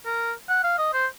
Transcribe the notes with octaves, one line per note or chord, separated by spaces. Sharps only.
A#4
F#5
F5
D#5
C5